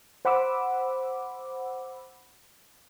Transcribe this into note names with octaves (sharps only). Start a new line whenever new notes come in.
C5 F#5 B5 D6 E6